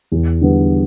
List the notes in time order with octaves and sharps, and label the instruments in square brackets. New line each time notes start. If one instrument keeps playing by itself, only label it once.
[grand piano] E2
D3 G3 B3